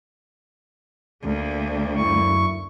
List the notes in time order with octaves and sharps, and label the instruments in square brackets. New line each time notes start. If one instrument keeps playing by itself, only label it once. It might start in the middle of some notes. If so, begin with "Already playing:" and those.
[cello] D2 A#3
[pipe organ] F#2 E4 C#6